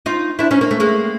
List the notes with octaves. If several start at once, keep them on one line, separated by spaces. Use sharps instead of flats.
D#4 F4
D4 E4
C#4 D#4
A#3
A3
G#3 A#3